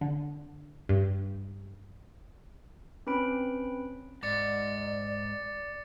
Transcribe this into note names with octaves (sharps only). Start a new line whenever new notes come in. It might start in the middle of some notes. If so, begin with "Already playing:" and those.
D3
G2
C4 C#4 B4 B5 D7
G#2 D5 D6 A6 C#7